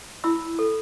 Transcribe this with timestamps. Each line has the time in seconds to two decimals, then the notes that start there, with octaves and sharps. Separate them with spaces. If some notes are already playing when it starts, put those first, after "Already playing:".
0.24 E4 B5 E6
0.59 A4